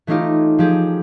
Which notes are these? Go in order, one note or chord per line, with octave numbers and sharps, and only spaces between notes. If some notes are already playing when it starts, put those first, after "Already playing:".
E3 A3 C#4 D#4 F4 G4
F3 G4 G#4